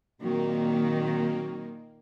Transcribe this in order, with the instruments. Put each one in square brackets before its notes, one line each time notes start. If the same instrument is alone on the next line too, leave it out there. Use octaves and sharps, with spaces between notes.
[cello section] A#2 D#3 [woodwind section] F#3 C4 F#4 [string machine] A#3